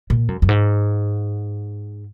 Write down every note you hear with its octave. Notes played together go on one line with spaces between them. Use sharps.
A#2
F#2
F#2
G#2